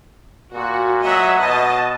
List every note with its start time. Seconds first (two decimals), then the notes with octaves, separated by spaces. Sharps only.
0.54 A#2 F#4
1.04 F#3 D#5 E5 F#5
1.40 B2 D#5 A5